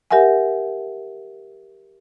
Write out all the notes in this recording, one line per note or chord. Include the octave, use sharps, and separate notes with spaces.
G4 A#4 E5 F#5 G#5